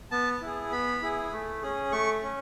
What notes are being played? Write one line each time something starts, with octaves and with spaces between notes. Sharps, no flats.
B3 A5
E4 G#4
B3 B5
E4 G#4
A3
C#4 G#4
A3 C#6
C#4